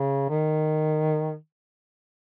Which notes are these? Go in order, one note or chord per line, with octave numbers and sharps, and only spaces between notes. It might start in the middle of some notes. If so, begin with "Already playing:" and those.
Already playing: C#3
D#3